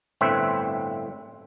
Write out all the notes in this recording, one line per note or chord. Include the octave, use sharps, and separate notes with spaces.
G1 A2 C4 B4 E5